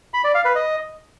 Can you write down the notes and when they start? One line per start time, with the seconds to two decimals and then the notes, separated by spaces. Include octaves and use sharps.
0.14 B5
0.24 D5
0.35 F5
0.45 B4
0.55 D#5